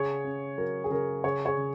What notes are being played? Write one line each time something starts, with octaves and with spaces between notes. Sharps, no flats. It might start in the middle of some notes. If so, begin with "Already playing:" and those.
Already playing: C#3 G#4 C#5
C#4
F#3 A#4
G#4
C#3 A#4
C#3 G#4 C#5
G#4 C#5
C#3